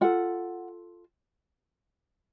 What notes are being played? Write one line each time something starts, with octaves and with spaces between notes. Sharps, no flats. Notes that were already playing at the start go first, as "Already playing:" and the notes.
F4 A4 F#5